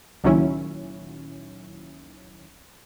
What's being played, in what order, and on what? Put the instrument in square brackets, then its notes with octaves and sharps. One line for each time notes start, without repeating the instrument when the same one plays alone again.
[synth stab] C#2 A#2 D#3 F#3 C#4 E4